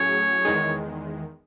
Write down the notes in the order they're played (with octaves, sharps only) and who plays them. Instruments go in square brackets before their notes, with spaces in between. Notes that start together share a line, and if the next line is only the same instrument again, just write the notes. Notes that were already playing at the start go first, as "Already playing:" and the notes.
Already playing: [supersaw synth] A2 F#3 C#4 G#4 [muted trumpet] C#5
[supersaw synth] E2 D#3 G#3